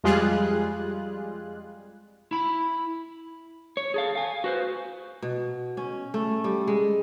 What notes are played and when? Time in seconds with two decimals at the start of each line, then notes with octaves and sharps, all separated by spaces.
0.04 F2 G3 G#3 F4 G#4 F#6
2.31 E4 B5
3.77 C#5
3.94 G#4 A4 F5
4.15 F5 G#5
4.44 F#4 B4 C5
5.22 B2
5.77 C#4
6.14 A3
6.44 G3
6.68 G#3